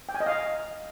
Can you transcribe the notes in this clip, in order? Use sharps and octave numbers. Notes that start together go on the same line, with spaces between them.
G5
G#5
D#5
F5